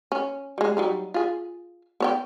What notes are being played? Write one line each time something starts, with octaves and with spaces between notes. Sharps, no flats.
C#4
G3 G#3
F#3 G3 D#4
F4 G#4
B3 C#5 G5